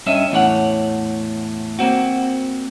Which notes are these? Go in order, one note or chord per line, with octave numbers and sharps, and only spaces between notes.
G2 C#4 D#5 E5
E2 A2 C#5 F#5
A#3 C4 F#4